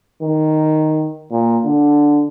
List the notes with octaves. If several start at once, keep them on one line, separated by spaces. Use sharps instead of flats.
D#3
A#2
D3